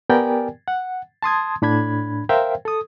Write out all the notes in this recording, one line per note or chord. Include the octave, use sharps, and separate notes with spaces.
B3 G4 A#4 D5 G5 G#5
F#5
A5 C6 D#6 G#6
A2 D4 B5 G#6
A#4 C5 E5 F5 G5
A4 D#6